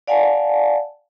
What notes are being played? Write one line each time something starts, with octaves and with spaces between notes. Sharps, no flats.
D5 F5 F#5 G#5 A5